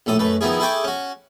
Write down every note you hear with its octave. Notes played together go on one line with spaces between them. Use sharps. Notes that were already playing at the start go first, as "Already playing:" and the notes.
A#1 A2 A4 D#6
F#2 A3 B4
D#3 F3 B3 E4 G#4
E4 G#4 A4 G5 C#6 D6
C#4 F#4